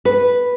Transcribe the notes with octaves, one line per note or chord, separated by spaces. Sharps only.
B4